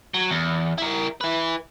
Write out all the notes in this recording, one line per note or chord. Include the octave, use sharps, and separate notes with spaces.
F#3
E2
E4 A#4
E4 B4